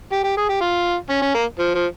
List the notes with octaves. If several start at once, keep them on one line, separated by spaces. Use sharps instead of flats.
G4
G4
G#4
G4
F4
C#4
C#4
A#3
F3
F3